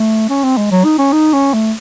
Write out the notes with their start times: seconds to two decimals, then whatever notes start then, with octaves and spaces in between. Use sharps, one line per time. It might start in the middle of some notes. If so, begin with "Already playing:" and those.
Already playing: A3
0.30 C#4
0.44 C4
0.57 G#3
0.71 F#3
0.85 D#4
0.99 C#4
1.13 D#4
1.33 C#4
1.54 A3